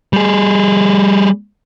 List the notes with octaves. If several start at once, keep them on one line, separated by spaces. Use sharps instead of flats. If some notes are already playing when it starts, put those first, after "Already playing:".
G3 G#4